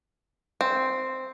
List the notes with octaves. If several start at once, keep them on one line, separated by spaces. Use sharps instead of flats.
C4